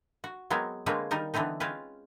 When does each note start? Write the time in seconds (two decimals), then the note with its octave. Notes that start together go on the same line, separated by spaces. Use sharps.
0.24 F#4
0.50 F#3 G#3 B3 C4 A#4
0.86 D3 G#3 A#3 C4 B4 C#5
1.11 D#3 G3 D#4 A#4
1.34 D3 E3 B3 C4 D#4
1.60 G#3 C4 C#4 F4 B4